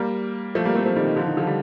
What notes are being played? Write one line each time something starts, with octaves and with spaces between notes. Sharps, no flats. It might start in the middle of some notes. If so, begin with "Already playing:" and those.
Already playing: G3 A#3
F3 A3
G3 A#3
A3 C4
F3 A3
D#3 G3
D#3
D3 F3
D#3
D3 F3
G3